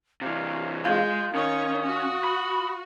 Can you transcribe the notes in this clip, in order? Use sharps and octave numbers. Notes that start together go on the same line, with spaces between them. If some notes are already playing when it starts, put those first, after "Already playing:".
C3 E3 F5
G#3 F4 G6
D#3 C#4 C#5 D#6
F#4
B5